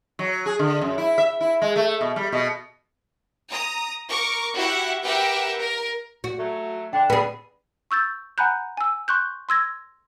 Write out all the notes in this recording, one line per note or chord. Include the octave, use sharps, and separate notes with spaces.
F#3
G#4
D3
F#2
E4
E5
E4
G#3
A3
B2
G3
B2
A#5 D#6
A#4 C#6 D6
E4 F#4 G4 E5 F#5
G4 A#4 B4 E5 F#5 G5
A#4
F#4
F#3 A3
D3 D4 G5
B2 D3 B3 G#4
C#6 E6 G6 A6
F#5 G#5 A#5 B5 F#6 G6
G#5 E6
C6 C#6 F#6 G6
C6 E6 G#6 A#6